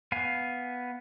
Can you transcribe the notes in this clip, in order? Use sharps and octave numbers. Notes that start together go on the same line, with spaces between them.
B3 F5 G#5